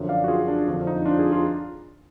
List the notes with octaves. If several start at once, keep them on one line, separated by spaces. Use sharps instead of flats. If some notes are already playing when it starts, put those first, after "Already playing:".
Already playing: F#2 D3 F3
D5 F5
F#4
F4 G#4
D4
F2 D3 F3
D#4
D4 F4
F4 G#4
F4 G#4